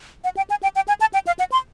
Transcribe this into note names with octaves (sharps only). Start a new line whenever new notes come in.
F#5
G5
G#5
G5
G5
G#5
A5
G5
F5
F#5
C6